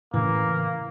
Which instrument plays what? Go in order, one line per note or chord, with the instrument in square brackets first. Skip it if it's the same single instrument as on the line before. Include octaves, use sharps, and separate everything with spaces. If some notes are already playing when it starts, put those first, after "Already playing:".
[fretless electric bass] A2 C#3 [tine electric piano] E3 [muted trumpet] A#3